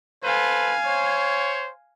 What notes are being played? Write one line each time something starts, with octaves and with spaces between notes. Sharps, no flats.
A4 B4 C5 F5 G#5
C5 C#5